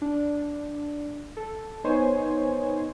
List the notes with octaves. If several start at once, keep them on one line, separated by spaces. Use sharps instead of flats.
D4
A4
B3 D#4 C5 C#5 G#5